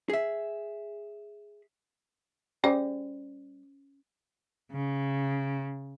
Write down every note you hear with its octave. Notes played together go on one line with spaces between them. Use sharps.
G#4 E5
G3 C#4 G4 G#4 C5
C#3